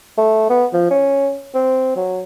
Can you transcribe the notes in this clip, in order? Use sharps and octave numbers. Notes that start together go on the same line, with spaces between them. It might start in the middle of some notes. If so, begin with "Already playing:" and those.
A3
B3
F3
C#4
C4
F#3